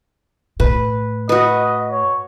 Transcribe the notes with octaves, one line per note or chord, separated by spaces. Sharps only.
A2 B4
F#4 B4 D#5
C#5